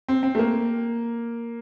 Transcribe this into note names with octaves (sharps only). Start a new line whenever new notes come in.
C4
C4
A3
A#3